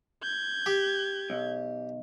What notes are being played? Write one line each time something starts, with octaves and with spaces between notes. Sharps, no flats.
G6 G#6
G4
B1